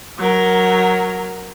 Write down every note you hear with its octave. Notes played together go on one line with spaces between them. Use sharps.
F#3 A#4